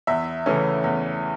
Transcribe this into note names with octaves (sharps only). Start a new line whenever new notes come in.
E2 E5
C#3 E3 A3 C#4
E2